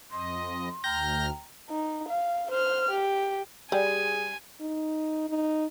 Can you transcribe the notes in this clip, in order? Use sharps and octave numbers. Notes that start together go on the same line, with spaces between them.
F2 D#5 C6
D2 G5 A#5 F6 G6 A#6
D#4
F5
C5 F6
G4
G3 G#4 D5 G5 G#5
D#4
D#4